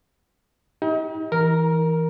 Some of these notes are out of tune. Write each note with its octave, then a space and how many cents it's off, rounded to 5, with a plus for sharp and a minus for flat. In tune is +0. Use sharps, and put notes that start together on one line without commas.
D#4 +40 G4 +0 D#5 +35
E3 -10 A#4 +0 A#5 +25